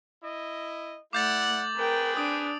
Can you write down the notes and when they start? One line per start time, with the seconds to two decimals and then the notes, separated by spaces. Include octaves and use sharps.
0.23 E4 D#5
1.13 A3 E4 D5 F#5 D6 G6 A6
1.43 F#7
1.76 C4 G#4 A#4 B4 G5
2.17 D4 D#6 D7